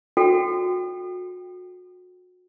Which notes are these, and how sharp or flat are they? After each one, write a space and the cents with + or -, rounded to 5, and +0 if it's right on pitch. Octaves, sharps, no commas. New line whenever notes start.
F#4 -30 A4 +0 G5 +0